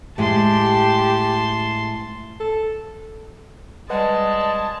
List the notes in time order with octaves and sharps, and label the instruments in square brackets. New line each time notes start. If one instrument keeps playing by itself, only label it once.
[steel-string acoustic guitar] A2 G#3 [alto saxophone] G4 [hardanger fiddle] A5 C6
[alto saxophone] A4
[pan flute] G3 [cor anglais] G#3 [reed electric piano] B4 D#5 F#5 [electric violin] A5